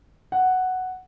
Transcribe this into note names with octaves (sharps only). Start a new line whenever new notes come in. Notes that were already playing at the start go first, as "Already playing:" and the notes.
F#5